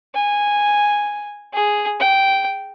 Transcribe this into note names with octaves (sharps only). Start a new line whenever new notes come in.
G#5
G#4
G5